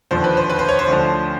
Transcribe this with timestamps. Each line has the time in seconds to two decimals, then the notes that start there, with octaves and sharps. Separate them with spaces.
0.11 D#2 D3 F3 C5
0.24 B4
0.37 C5
0.50 B4
0.59 C5
0.69 C#5
0.79 C5
0.88 D2 D3 F3